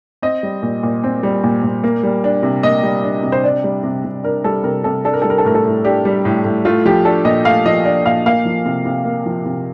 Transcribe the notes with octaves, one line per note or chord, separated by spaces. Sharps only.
C4 D#5
G3
A#2
A#2
C4
G3
A#2
A#2
A#3
G3
D4
C3
A#3 D#5
G3
D4
C3
C5
D4 D5
G3
C3
C3
D4 A#4
G3 A4
C3 A#4
C3 A4
D4 A4
A#4
G3 A4
A#4
A4
A2 A#4
A4
A2
D4 G4
G3
A2
A2
A3 F4
F3 G4
D4 A4
A#2 D#5
A3 F5
F3 D#5
D4 D5
A#2 F5
A#3 F5
F3
C3
C3
A#3
F3
C3